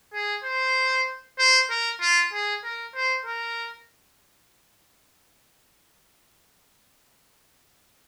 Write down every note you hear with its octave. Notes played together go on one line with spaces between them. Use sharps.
G#4
C5
C5
A#4
F4
G#4
A#4
C5
A#4